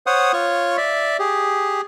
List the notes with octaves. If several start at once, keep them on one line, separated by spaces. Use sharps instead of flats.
C5 C#5 F#5 D#6
F4 C#5 C#6
D5 E5
G4 G#4